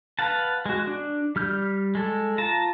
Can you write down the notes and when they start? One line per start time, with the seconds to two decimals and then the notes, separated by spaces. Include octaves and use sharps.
0.19 B4 F5 F#5 A5
0.66 G#3 F#4
0.87 D4
1.36 G3 F6 G6
1.95 G#3 A4
2.38 F4 A5 A#5